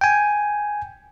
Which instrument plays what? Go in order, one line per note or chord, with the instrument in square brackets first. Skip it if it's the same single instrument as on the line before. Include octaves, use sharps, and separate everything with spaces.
[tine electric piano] G5 G#5